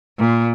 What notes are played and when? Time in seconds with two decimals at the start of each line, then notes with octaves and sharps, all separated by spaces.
0.18 A#2